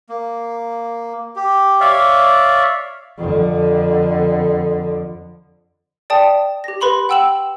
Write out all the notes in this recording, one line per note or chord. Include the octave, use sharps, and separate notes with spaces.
A#3
G4
C#5 D5 E5 F5
F2 D3
D5 G5 A5 D#6
G4 A#6
B4 B5 C6 F#7
F#5 G5 E6 E7 F#7